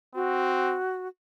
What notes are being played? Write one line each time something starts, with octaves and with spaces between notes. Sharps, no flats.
C4 F#4